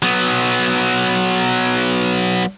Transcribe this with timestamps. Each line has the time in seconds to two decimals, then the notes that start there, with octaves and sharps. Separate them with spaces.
0.03 F#3 B3